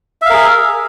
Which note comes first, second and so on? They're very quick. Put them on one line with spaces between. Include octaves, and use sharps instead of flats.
E5 F5 A#4 G#4